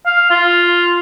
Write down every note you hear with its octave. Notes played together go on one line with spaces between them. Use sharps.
F5
F4